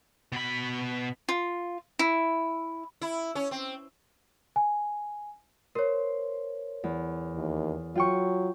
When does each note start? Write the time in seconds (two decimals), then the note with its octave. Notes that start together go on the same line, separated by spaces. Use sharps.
0.32 B2 B5
1.29 F4
1.99 E4
3.02 E4
3.35 C#4
3.51 C4
4.56 G#5
5.75 A#4 C5 C#5
6.84 E2
7.36 D#2
7.95 F#3 F4 G5 C#6